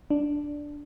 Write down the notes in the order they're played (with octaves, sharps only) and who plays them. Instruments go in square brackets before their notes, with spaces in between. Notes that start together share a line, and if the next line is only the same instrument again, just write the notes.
[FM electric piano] D4